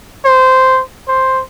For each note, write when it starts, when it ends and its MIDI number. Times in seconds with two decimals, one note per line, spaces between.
0.25 0.81 72
1.08 1.43 72